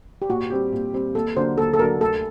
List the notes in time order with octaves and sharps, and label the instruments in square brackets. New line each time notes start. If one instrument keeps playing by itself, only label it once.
[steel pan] G4
[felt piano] A#2 [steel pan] F#4
[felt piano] G3 C4 G4
A#2
G3 C4 G4
[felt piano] D#2 [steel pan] A4
[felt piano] D3 F#3 A#3 D4 [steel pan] C5
[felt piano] D#2 [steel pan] A4
[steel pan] A4
[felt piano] D3 F#3 A#3 D4 [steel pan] A#4
[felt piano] D2 [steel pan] A4